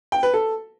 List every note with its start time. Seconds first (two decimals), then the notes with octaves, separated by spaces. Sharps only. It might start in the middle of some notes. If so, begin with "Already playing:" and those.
0.12 G5
0.23 B4
0.34 A4